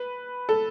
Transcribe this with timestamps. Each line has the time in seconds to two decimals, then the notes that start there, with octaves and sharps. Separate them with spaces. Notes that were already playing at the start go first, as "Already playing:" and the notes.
Already playing: B4
0.49 A4